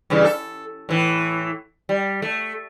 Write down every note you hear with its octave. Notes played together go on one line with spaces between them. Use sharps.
G2 C#3 E3
A4
A2 E3
G3
A3